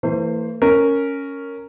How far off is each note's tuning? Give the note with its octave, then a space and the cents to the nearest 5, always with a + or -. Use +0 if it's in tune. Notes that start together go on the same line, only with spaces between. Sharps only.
E3 +0 A3 +45 C5 +0
C#4 +0 A#4 -10